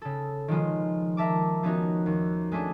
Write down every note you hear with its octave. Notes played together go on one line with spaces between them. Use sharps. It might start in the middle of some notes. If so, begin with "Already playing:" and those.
C#3 A4
D#3 F3 G#3 F4
A#4 E5 A5 D6
F3 B3 C#4 D#4 F#4 A#4
D#2
G#3 A3 C#4 D4